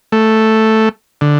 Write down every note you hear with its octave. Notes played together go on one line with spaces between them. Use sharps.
A3
D3